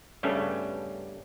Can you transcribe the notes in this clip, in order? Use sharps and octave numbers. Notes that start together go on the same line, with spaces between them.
G2 C#3 G3 A3 B3 C#4